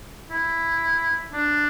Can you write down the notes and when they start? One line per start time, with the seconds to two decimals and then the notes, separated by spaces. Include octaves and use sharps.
0.30 E4
1.33 D4